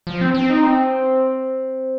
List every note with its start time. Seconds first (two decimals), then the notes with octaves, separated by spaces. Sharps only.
0.07 F3
0.21 C4
0.35 C4
0.50 D#4
0.63 C4